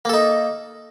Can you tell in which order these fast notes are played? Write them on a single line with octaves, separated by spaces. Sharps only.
A#3 A4 D#4